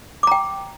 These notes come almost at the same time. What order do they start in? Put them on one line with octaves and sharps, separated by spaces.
D6 A#5 G5